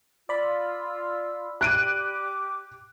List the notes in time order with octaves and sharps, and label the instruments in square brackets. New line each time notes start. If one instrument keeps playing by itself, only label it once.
[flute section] F4 E6 [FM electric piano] D5 B5
[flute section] G4 D6 [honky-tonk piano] F#6 D7 D#7